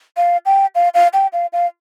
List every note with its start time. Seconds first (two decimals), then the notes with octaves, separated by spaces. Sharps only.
0.17 F5
0.46 G5
0.75 F5
0.94 F5
1.13 G5
1.33 F5
1.53 F5